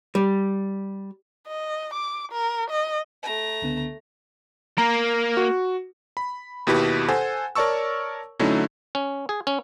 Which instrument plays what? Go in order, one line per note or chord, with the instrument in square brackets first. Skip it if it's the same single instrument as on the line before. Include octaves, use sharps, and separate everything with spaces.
[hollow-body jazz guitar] G3
[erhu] D#5
D6
A#4
D#5
[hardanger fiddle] A3 A#5
[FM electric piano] C#2 D3 B3
[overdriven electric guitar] A#3 [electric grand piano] A#5
[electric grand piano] F#4
B5
D#2 B2 E4 G4 B4
A4 C5 F#5 G#5
A#4 C#5 D5 A5 C#6 E6
D3 F#3 A3 C#4 D#4 E4
[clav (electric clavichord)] C#4
G#4
C#4